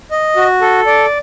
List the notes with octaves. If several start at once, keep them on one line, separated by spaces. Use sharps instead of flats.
D#5
F#4
A4
D5